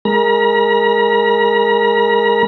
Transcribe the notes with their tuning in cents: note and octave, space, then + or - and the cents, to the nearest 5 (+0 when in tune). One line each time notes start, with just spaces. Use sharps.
G#3 +0 A#4 +0 A#5 +45